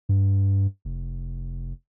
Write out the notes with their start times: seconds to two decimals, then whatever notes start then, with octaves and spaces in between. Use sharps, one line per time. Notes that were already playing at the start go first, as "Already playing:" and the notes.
0.09 G2
0.85 F1